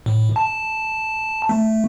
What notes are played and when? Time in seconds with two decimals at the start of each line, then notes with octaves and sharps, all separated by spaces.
0.06 A2
0.36 A5
1.49 A3